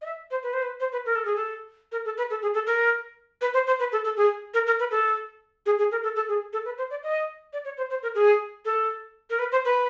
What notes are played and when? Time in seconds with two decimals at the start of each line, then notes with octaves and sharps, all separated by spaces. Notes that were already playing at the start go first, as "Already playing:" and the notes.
0.02 D#5
0.06 E5
0.31 C5
0.43 B4
0.53 C5
0.62 B4
0.80 C5
0.92 B4
1.06 A#4
1.15 A4
1.25 G#4
1.36 A4
1.92 A#4
2.05 A4
2.18 B4
2.30 A4
2.42 G#4
2.54 A4
2.67 A#4
3.41 B4
3.54 C5
3.67 C5
3.79 B4
3.92 A4
4.05 A4
4.17 G#4
4.54 A#4
4.67 A#4
4.79 B4
4.91 A4
5.66 G#4
5.79 G#4
5.91 A#4
6.03 A4
6.16 A4
6.28 G#4
6.53 A4
6.65 B4
6.78 C5
6.90 D5
7.03 D#5
7.53 D5
7.65 C#5
7.77 C5
7.90 C5
8.03 A#4
8.15 G#4
8.65 A4
9.30 A#4
9.39 B4
9.52 C5
9.65 B4